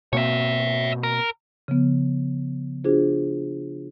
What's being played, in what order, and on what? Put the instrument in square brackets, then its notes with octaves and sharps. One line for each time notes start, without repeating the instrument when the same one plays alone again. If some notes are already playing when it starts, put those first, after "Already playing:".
[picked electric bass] B2 A#3 C4 [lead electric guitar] C#5 E5
[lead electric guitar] A#4
[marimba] C#3 F3 B3
D4 F4 F#4 G#4 C5